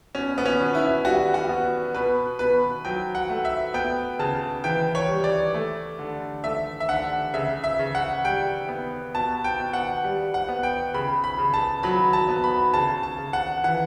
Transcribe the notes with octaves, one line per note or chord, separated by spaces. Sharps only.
B2 C#4
B3
C#4
B2
E4
G3 F#4
F#4
B3
B2 B4
B2 B4
F#3 G5
F#5
A3
E5
B3 G5
C#3 A5
E3 G5
C#5
G3
D5
A3
D3
A3 E5
E5
D3 F#5
C#3 E5
E5
C#3
F#5
G3 G5
B3
B2 A5
G5
B2
F#5
G3
F#5
B3
G5
C#3 B5
B5
C#3
A5
F#3 B5
A5
B3
B5
C#3 A5
A5
C#3
F#5
E3 F#5